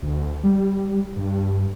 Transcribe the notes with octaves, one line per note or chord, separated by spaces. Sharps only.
D2
G3
G2